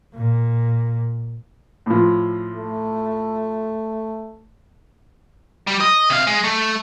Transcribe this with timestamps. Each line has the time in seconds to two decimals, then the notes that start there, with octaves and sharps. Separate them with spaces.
0.14 A#2
1.86 A2 F3
2.55 A3
5.67 G3
5.80 D#5
6.10 C3 F5
6.27 G#3
6.44 A3